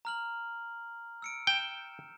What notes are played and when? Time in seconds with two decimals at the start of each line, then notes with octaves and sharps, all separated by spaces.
0.05 A#5 F6 F#7
1.22 E6 C#7 D7
1.47 G5 G6 E7